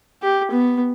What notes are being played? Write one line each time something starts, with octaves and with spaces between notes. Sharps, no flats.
G4
B3